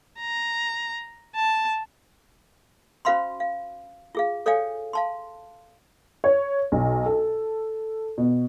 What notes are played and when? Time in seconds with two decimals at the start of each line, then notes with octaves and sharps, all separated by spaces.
0.20 A#5
1.36 A5
3.05 C#4 F#4 C5 F5 B5 C6
3.40 F5
4.15 F4 G#4 F5
4.46 A4 C#5 D5 F5 G5 G#5
4.93 F5 A5 C6
6.24 C#5
6.72 B1
7.06 A4
8.18 B2